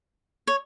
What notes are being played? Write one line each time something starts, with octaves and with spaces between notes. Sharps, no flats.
C#5